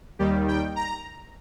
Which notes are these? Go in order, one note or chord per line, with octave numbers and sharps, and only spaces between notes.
D#2 D#3 G3 G4
G5
A#5